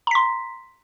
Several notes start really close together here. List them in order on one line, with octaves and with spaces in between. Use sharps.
A#5 B6 C6